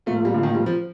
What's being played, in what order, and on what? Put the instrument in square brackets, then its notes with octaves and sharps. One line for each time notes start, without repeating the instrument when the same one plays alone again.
[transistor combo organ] A2 F3 A#3 F4 [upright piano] A3
[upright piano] G3
D3
D#3
G3
F3